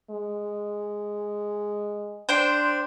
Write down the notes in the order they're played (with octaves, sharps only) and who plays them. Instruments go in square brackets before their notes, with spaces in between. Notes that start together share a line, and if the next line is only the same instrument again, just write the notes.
[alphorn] G#3
[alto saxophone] D4 [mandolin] C5 G5